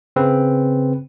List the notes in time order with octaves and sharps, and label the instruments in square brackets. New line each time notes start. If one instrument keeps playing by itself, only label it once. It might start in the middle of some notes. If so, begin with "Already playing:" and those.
[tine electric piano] C#3 C4 B4